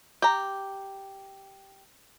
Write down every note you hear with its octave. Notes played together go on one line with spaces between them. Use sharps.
G4 A#5